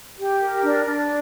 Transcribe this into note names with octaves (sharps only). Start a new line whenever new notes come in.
G4
A#4
D4
D4